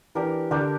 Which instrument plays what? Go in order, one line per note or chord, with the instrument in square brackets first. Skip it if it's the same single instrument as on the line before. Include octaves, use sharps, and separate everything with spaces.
[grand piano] E3 [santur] D4 G4 A#4
[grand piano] D3 [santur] D4 G4 A#4